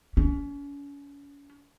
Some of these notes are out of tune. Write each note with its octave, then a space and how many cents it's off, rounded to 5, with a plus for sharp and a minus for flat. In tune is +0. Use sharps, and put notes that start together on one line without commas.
C#4 +35